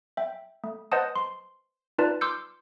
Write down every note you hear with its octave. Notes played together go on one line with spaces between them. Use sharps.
E5 G5
A3
B4 C5 D#5 F#5 A5 D#6
C6
D#4 F4 A#4 B4 D5 A5
C6 D6 E6 F6 G6 C#7